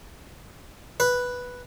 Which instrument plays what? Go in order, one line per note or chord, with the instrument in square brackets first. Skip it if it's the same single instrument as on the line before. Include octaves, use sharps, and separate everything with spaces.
[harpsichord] B4